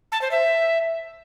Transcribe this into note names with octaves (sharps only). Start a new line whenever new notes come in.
A5
C5
E5